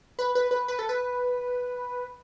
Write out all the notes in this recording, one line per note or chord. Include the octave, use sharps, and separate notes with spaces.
B4
B4
B4
B4
A4
B4